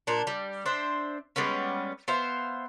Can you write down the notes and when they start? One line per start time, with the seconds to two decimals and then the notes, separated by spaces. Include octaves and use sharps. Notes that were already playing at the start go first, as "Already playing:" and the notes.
0.07 A#2 D4
0.27 G3
0.66 D4 C5 E5
1.36 G3 G#3 B3 C#4
2.08 B3 C5 E5 F5